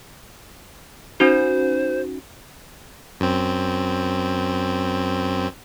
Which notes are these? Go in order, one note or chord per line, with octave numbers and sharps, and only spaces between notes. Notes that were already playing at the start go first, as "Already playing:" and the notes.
C#4 D#4 F#4 C5
F#2 C4